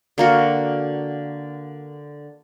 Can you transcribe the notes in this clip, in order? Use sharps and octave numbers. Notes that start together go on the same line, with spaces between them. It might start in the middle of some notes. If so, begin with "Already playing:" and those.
D3 A#3 F#4